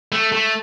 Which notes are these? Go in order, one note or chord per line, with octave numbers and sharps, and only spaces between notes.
A3
A3